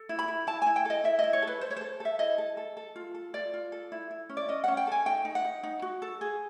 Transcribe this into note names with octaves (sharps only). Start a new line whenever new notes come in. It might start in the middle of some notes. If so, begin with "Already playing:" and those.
Already playing: A4
E4
B5
E4
E4 A5
E4 G#5
G5
A4 D#5
E4 E5
D#5
E4
C#5
A4 B4
A4 C5
C#5
A4 C5
A4 E5
E4 D#5
A4
A4
A4
F4
A4
F4 D5
F4
A4
E4
E4
C#4
D5
C#4 D#5
C#4 F#5
G5
A4 G#5
D#4 G5
D#4
F#5
D#4
D#4
F#4
A4
G#4